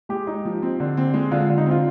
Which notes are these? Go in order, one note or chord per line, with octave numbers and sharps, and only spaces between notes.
G#3 G4
D#4
F3
C4
D3
C4
G#3
D3 F4
D3
D#4
C4 F4